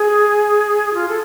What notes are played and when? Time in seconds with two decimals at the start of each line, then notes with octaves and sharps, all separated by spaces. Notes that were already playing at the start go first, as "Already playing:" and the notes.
Already playing: G#4
0.94 F4
1.09 A4